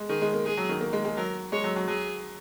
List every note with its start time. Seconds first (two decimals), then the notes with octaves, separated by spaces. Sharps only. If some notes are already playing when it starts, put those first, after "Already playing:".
Already playing: G#3
0.09 D#3 G#4
0.22 G#3
0.33 A#3
0.45 G#3 G#4
0.57 F#3
0.69 D#3
0.81 A#3
0.93 G#3
1.05 G#3
1.17 F#3 A#4
1.52 G#3 C#5
1.64 F#3
1.76 F#3
1.87 F#3 G#4